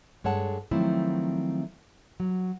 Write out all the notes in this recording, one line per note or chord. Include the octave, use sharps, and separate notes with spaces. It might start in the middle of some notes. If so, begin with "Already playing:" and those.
G2 G#3 A4 C#5 F#5 A5
D#3 F3 F#3 A3 C4 E4
F#3